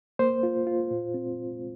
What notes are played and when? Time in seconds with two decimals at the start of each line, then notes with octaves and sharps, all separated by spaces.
0.19 A#3 C5
0.43 F4
0.67 F4
0.91 A#2
1.14 C4